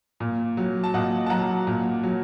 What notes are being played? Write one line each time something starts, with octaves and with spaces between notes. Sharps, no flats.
A#2
F#3
A5
A#2 D#5 F#5
A5
F#3 F#5 A#5
A#2
F#3